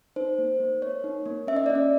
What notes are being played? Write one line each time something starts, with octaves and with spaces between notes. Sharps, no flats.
D#4 C5
A#3
A#3
A#3 C#5
D#4
A#3
C#4 E5
D#5
C#4 D5
D#5